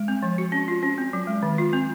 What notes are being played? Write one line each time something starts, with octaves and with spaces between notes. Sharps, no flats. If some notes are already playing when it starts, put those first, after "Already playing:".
Already playing: G#3
C4
F3
F#4
C#4
F4
C#4
C4
F#3
G#3
D#3
F4
C4